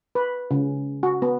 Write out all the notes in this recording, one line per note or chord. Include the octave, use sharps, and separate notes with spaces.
B4
C#3
F#4
B3